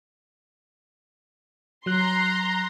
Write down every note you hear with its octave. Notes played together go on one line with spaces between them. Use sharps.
F#3 A#5 C6 F#6